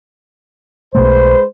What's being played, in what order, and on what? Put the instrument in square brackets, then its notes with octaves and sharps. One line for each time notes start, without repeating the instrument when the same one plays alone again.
[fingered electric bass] B1 B2 A3 [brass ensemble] G#3 B4 C5